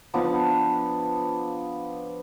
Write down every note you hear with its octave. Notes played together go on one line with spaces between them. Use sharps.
F3 B3 D4